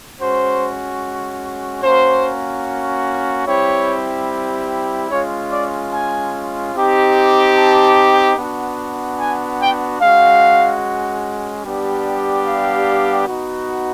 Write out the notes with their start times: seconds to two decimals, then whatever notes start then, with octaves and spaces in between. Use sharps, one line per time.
0.20 G#3 C#4 F#4 C5
1.83 A#3 C#4 F#4 C5
3.47 G3 C4 E4 G4 C#5
5.10 G#3 C#4 F4 C#5
5.52 D5
5.92 G#5
6.74 C4 D#4 G4
7.56 A5
8.38 B3 D4 F#4
9.19 G#5
9.60 G5
10.01 G#3 C#4 F#4 F5
11.65 G3 B3 D4 G4
12.46 F5
13.28 B3 D#4 F#4